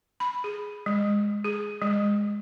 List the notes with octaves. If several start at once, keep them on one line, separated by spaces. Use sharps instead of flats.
B5
G#4
G#3
G#4
G#3